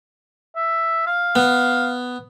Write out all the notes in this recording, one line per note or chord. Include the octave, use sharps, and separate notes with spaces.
E5
F5
B3